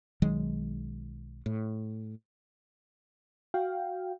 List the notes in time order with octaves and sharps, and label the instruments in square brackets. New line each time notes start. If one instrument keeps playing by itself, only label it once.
[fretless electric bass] B1 D#3 F#3 G#3
A2
[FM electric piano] F#4 F5 G5